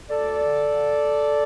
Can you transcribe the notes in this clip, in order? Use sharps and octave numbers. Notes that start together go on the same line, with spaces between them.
D2 A4 D5
D3
D3